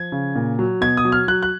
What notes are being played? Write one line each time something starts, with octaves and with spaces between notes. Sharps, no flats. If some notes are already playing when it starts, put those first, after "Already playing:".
Already playing: F3 G#6
C#3
A#2
F#3
B2 G#6
D#6
F#3
F6
F#3 F#6
F#6